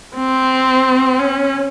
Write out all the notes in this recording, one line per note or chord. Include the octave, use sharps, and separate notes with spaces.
C4
C#4